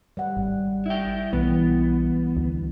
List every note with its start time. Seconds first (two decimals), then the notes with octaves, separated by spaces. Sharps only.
0.17 G3 F#5
0.37 G#1
0.86 E4 G5
1.33 B1 E3 B3
2.37 D2